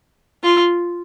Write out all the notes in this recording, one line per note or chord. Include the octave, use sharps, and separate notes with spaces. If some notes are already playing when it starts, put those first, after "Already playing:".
F4